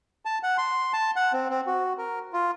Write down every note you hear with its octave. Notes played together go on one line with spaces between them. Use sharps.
A5
F#5
C6
A5
F#5
C4
C4
F#4
A#4
F4